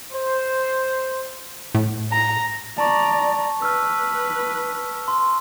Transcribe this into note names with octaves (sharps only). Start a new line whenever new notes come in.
C5
A2
A#5
D5 A5 A#5 C#6
B4 E6 F6
C6